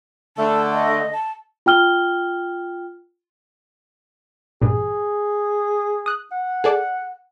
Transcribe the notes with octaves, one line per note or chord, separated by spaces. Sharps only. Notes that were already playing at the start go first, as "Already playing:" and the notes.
D3 A3 A5
D#5
A5
F4 G5 F6 G7
A1 G2 A#2 G#4
D#6 F#6
F#5
G#4 A4 D5